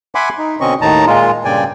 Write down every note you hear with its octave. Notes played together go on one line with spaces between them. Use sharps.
E5 F#5 G#5 B5 C6 D6
D#4
B2 D3 C4 C#4 D#5 C#6
D#2 A2 D#3 D#4 A5 A#5
A#2 G#3 F4
G2 A#2 C#3 D5 G5 G#5